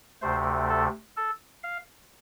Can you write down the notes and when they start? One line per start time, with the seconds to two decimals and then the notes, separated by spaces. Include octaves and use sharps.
0.22 D2 C3 A3 C5
0.69 A4
1.16 A4
1.63 F5